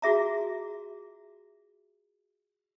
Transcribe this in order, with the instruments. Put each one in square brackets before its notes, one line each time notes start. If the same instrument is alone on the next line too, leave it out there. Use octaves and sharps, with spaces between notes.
[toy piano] F4 F#4 G#4 E5 A#5